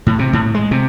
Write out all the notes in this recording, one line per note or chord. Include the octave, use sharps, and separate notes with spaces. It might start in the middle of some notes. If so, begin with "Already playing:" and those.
A2
C3
A2
G#3
C3